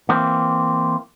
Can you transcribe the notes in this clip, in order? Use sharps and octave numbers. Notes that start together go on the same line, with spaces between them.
E3 A#3 C4